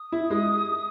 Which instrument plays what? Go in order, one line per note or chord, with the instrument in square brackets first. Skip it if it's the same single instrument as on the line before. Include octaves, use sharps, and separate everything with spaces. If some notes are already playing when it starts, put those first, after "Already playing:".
Already playing: [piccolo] D#6
[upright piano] E4
G#3